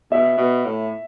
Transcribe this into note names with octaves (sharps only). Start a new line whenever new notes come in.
B2 E5
B2
A2